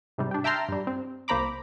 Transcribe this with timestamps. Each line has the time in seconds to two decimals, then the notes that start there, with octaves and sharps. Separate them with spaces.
0.18 G#2 C3 G3
0.31 D4 G4
0.44 E5 G5 A5 A#5 C6 F6
0.69 G2 G3
0.87 C4
1.28 C2 A#3 C5 A#5 B5 D6